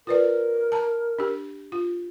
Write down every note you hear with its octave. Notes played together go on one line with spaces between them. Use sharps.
F4 A#4 B4 D5
A5 A#5
D4 G4
F4